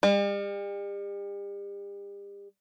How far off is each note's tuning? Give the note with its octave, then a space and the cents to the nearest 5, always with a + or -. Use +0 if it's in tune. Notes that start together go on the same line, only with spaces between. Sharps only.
G3 +40